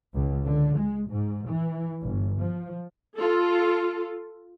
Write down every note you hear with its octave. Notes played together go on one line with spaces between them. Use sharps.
C#2
D3
G#3
G#2
E3
G1
F3
F4 A4